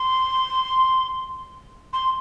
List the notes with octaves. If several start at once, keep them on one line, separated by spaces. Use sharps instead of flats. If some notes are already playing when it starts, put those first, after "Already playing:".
Already playing: C6
C6